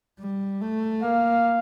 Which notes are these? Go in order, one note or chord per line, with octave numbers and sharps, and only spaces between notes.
G3
A3
A#3 F5